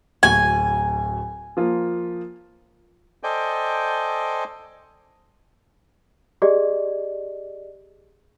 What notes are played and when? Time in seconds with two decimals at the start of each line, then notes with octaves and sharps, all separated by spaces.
0.23 D1 D2 G#5 C#6
1.57 F3 A#3 F4
3.23 A4 C5 D5 D#5 G5 G#5
6.42 G4 G#4 D5 D#5